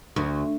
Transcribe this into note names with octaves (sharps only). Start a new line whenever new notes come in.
D2